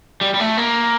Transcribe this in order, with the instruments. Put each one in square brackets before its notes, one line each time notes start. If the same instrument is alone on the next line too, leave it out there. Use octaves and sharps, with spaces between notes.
[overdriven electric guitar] G3
G3
A3
A#3